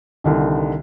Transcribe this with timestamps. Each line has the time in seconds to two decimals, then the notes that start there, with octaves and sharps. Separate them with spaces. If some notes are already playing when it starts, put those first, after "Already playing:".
0.24 C2 D3 D#3